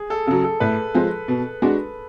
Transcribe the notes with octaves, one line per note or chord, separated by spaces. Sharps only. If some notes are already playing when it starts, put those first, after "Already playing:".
Already playing: G#4
A4
C#3 F#3 A4
A4
A2 B4
F3 G#3
B2
G#3 D4 F#4